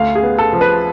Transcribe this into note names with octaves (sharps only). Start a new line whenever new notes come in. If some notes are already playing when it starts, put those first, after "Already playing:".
Already playing: D2 F5
G#4
B3
A4
F3
B4